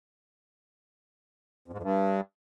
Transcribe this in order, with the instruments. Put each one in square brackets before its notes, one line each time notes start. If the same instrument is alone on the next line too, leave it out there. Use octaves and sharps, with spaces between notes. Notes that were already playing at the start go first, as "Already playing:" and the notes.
[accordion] F2
G#2
F2
G2